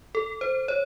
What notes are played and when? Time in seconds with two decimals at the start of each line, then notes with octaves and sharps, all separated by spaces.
0.15 A4
0.41 C5
0.68 C#5